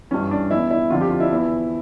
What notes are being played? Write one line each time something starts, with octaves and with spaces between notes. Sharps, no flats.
G2 E3 C#4
D4
E2 E3 E4
E4
F2 D3 F3 F4
G4
F4
E4
E2 E3